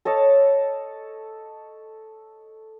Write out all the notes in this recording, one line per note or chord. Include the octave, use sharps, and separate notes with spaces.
A4 C#5 D#5 A5